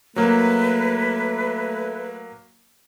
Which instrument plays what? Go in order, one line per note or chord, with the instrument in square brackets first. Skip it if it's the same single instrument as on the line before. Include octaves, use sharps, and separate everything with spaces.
[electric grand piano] F#3 A#3 [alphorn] A3 [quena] B4